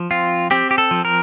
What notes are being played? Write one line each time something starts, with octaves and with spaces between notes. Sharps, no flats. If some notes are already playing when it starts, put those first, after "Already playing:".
Already playing: F3
C4 F4
C4 G4
G4
A4
F3
A#4